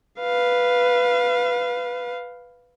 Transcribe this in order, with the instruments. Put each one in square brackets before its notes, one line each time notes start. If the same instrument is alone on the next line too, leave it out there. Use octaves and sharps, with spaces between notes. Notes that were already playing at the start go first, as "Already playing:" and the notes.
[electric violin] B4 F5